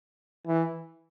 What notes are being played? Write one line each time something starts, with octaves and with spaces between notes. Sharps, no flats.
E3